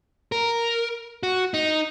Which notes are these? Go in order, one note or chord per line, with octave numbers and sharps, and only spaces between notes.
A#4
F#4
D#4